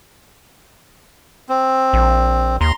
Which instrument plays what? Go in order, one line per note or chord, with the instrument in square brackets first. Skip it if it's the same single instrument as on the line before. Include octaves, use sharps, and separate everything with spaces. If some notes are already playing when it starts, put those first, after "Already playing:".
[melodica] C4
[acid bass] A#1
[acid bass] D#2 [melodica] A#5 C6